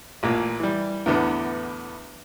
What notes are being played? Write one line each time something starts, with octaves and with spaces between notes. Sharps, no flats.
A1 A#2
E3 G3
E2 A2 D3 B3